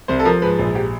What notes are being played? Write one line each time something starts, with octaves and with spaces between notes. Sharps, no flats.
C2 C5
A4
F3 A#4
G#2 B4
A#1
G4